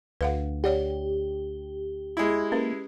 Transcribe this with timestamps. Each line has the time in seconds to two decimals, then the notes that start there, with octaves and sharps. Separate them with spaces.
0.21 D2 B4 F5 F#5
0.64 G4 C#5 D5 F#5
2.17 G#3 E4
2.52 A#3 C#4 B4